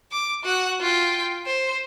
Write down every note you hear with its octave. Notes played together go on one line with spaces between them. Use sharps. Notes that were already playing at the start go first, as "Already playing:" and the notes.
D6
F#4 F#5
F4 G5
C5